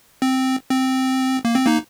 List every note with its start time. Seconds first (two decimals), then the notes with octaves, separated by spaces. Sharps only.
0.22 C4
0.70 C4
1.45 A#3
1.55 C4
1.66 A#3 D#4